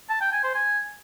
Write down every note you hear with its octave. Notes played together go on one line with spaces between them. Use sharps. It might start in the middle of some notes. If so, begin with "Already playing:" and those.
A5
G5
G#5
C5
G#5